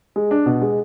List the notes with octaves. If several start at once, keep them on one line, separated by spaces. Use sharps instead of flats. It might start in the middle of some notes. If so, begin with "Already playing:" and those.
G#3
D4
B2
G#3